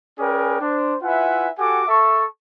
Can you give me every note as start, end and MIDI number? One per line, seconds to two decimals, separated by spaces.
0.18 0.56 61
0.18 0.56 68
0.18 0.56 70
0.18 0.56 71
0.18 0.56 74
0.18 0.56 79
0.61 0.95 62
0.61 0.95 72
1.02 1.48 64
1.02 1.48 65
1.02 1.48 71
1.02 1.48 76
1.02 1.48 78
1.02 1.48 80
1.58 1.84 66
1.58 1.84 67
1.58 1.84 69
1.58 1.84 78
1.58 1.84 80
1.58 1.84 86
1.87 2.25 69
1.87 2.25 76
1.87 2.25 81
1.87 2.25 85